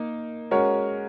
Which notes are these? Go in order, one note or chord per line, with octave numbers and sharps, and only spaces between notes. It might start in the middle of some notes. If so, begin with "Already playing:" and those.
Already playing: A#3 D#4
G#3 C#4 F#4 A#4 C#5